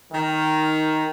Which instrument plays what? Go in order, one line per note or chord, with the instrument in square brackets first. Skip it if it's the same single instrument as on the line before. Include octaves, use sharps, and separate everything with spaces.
[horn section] D#3